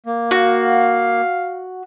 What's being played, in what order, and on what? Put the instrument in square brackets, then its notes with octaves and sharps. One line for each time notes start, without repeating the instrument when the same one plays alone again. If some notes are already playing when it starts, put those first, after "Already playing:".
[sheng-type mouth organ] A#3
[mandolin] F#4 [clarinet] F5